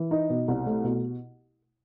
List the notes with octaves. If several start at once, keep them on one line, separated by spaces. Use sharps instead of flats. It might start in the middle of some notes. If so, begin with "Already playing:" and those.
Already playing: E3
D#4
B2
C2
A3
B2